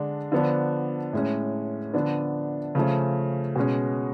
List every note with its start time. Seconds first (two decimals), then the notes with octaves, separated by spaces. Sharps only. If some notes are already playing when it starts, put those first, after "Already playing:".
Already playing: D3 G#3 D4
0.32 D3 F3 B3 D4
1.13 A2 G#3 C#4
1.94 D3 F3 B3 D4
2.75 C#3 F3 A3 C#4
3.56 B2 G#3 C#4